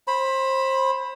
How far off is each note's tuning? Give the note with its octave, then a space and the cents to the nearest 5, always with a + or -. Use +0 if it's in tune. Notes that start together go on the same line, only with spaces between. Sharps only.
C5 +25 B5 +0